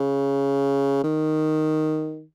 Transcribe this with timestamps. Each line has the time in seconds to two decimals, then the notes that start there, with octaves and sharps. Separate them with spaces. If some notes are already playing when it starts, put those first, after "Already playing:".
Already playing: C#3
1.04 D#3